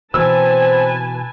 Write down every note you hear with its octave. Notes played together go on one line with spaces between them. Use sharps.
B2 E3 C4 B4 G#5 A5 E6